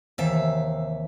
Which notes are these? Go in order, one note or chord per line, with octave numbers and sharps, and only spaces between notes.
D#2 C3 E3 E5 F5